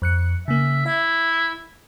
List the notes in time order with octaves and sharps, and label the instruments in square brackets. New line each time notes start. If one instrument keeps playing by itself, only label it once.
[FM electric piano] F2 F#6 C#7
[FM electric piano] C#3 A#3 [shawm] E5
[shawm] E4 [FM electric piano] E5